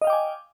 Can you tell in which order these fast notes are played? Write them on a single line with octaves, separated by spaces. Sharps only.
D#5 F5 G5 D6 G#5